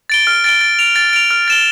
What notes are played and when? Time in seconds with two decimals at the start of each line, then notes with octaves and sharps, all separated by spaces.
0.10 A6 D7 G7
0.27 F6
0.44 A6 D7 G7
0.61 A6
0.79 D7 F7
0.96 A6
1.13 D7 F7
1.31 F6
1.48 A6 E7 G7